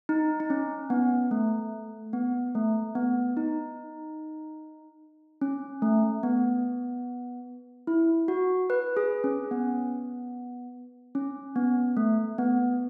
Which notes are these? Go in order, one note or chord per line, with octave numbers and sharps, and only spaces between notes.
D#4
D#4
C#4
B3
A3
B3
A3
B3
D#4
C#4
A3
B3
E4
F#4
B4
G#4
C#4
B3
C#4
B3
A3
B3